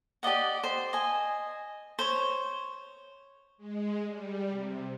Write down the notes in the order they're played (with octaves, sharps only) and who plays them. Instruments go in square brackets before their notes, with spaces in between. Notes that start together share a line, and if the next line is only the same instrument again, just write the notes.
[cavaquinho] G4 D5 D#5 F#5
C5
D#5 G#5
C5 C#5
[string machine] G#3
G3
C3